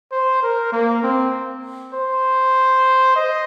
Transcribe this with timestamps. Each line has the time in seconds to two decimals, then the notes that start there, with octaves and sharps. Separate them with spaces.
0.12 C5
0.42 A#4
0.72 A#3
1.03 C4
1.94 C5
3.16 D#5